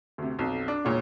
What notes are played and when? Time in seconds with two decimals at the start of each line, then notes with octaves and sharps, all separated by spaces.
0.18 D2 C3
0.39 B1 F2
0.68 D4
0.85 E1 A#2 C#5